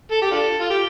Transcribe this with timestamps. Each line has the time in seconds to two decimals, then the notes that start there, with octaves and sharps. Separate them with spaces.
0.11 A4
0.22 G4
0.31 D4 F4 A4
0.60 F4
0.70 G4